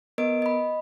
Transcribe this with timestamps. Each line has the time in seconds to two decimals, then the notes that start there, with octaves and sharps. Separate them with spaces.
0.18 B3 A#4 D#5 D7
0.42 D#5 B5